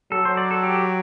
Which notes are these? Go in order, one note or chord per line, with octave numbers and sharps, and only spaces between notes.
F#3 A4
C5
D5
A4
G4